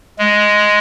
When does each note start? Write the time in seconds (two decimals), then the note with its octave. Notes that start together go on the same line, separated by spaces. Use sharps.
0.19 G#3